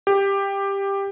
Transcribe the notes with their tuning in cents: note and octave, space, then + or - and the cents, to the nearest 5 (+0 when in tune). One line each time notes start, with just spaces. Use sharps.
G4 +10